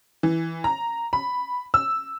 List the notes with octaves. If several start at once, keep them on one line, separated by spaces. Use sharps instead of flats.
E3
A#5
B5
E6